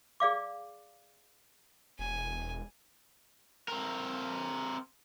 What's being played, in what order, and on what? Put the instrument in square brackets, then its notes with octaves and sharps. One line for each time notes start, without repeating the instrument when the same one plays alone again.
[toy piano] G#4 D5 F5 D6
[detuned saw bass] E1 [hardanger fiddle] G#5
[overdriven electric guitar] C4 A#4